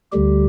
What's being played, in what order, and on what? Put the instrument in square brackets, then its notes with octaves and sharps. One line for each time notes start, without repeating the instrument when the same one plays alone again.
[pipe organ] D2 D3 G3 G4